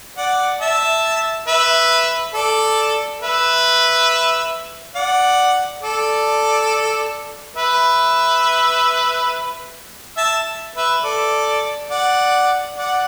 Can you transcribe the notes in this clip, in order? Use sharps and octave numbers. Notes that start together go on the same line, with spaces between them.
D5 F#5
E5 A5
B4 E5
A4 D5
B4 E5
D5 F#5
A4 D5
B4 E5
E5 A5
B4 E5
A4 D5
D5 F#5
D5 F#5